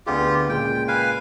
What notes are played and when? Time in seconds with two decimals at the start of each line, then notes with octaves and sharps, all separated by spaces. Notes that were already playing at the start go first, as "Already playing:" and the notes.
0.06 D2 B3 F4 G4 G#4
0.49 A#2 C#3 G#3 G5
0.88 B4 F5 G#5